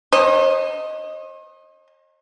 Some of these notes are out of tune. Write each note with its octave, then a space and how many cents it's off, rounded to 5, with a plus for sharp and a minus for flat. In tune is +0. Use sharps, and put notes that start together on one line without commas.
C5 +45 D#5 +0